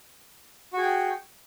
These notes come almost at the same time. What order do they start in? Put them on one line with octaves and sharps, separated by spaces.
F#4 G#4 G5